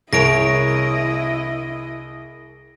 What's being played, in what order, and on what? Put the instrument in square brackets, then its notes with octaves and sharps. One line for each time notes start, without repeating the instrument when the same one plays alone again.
[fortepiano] C2 [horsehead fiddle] E4 D#5 [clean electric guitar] G#4 A#4 C#5 [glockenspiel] A#6 D7